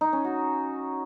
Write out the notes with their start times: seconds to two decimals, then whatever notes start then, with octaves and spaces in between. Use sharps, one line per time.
0.01 D#4
0.13 C#4
0.25 F#4